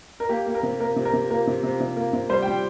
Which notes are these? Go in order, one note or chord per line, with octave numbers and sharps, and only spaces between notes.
A#4
A#3 G4
A#3
A#4
C3
A#3 A#4
C3
A#4
C3
A#3 A#4
C3
C3
C3
A#3
C3
G3 C5
G3 G5